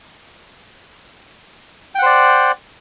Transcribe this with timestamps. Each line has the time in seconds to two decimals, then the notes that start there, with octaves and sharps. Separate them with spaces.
1.95 G5
1.99 F#5
2.02 C5
2.06 D5